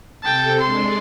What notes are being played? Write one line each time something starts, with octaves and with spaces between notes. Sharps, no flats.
C3 A4 G5 A5
G#3 D4 C6